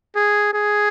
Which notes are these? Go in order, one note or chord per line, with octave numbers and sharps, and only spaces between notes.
G#4
G#4